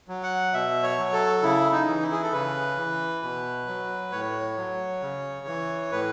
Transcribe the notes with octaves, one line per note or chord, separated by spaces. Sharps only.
F#3
F#5
B2 E5
C#5
F#3
A4
C#3 E4
D#4
E3
E4
G#4
A4
C#3 B4
E3
B2
F#3
A2 C#5
F#3
C#3
E3
A2 B4